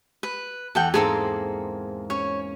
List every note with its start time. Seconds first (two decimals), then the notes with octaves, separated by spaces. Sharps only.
0.23 B4
0.75 E2 A4 F#5 G5
0.94 G#2 A#3 C4 G#4 A4
2.10 C#4 C#5